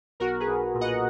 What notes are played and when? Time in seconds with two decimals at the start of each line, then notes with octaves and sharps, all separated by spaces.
0.20 B1 F#4 A#4
0.40 G#4 B4
0.48 B1
0.74 A#2
0.81 D#5 F#5